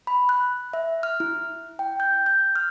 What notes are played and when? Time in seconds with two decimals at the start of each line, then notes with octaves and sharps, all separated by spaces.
0.07 B5
0.29 F#6
0.73 E5
1.03 F6
1.20 E4
1.79 G5
2.00 G6
2.26 G6
2.56 F6